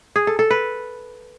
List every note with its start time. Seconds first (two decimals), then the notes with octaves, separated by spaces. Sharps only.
0.16 G#4
0.27 A4
0.39 A4
0.50 B4